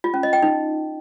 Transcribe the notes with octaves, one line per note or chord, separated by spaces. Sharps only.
F4
C#4
D#5
G5
D#4